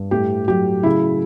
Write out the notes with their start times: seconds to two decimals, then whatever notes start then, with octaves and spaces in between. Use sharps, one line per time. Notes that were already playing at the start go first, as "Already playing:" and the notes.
Already playing: G2
0.11 A2 G4
0.48 F#3 G4
0.83 C#3 E4